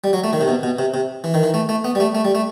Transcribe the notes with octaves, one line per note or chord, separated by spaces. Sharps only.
G3
F#3
A3
D#3
C3
B2
B2
C3
C3
E3
D#3
E3
A3
A3
B3
G3
A3
A3
G3
A3